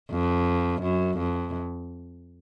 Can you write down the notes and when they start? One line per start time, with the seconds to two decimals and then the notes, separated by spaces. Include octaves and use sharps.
0.11 F2
0.82 F#2
1.18 F2